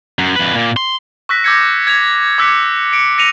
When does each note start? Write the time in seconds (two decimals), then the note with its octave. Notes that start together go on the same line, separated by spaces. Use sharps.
0.19 F#2
0.36 F2 B4
0.55 A#2
0.77 C6
1.29 C#6 E6 F#6 A#6 B6
1.44 D6 E6 G6 G#6 A#6 C#7
1.87 G#6 C#7 F7
2.38 D6 E6 F#6 G#6 B6 C#7
2.93 C#7 D7
3.18 A#6 C#7 D#7 F7